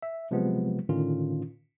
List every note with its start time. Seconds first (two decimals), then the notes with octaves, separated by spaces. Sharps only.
0.02 E5
0.31 C3 F3 F#3 G#3 B3
0.89 A2 D3 D#3 C#4 F4